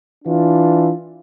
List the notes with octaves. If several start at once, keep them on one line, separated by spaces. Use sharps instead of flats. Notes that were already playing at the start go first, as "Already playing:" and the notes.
E3 D4 F4